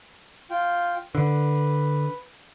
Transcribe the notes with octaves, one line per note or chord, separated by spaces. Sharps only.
F4 G5
D3 B4